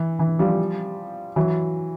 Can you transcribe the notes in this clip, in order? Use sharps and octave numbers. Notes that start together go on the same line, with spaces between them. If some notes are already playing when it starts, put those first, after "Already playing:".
Already playing: E3
E3
F3 G3
E3 F#3